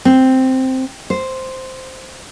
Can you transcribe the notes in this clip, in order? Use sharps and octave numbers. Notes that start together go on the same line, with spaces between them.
C4
C5